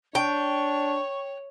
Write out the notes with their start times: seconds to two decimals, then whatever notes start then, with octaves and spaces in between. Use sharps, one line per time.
0.15 D4 C#5 G5 C#6